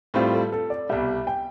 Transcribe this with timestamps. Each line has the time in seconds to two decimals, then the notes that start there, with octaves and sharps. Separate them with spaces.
0.14 A2 G3 C4 F4 C5
0.33 A4
0.52 A4
0.70 D5
0.89 C2 B2 G3 E5
1.27 G5